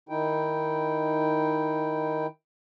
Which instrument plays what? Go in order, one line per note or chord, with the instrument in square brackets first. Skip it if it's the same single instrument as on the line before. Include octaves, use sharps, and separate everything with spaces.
[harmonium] D#3 D#4 E4 G5